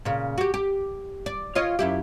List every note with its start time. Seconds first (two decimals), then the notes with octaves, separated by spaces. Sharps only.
0.05 A#2 C#3
0.38 F#4 G4
0.54 G4
1.26 D5
1.55 F4 C#5 D#5
1.79 F#2 E4 G4